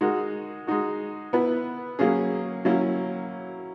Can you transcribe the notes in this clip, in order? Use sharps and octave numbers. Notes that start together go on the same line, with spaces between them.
G#3 D#4 F#4 A#4
G#3 D#4 F#4
B3 E4 B4
F#3 A#3 C#4 G#4
F#3 A#3 C#4 E4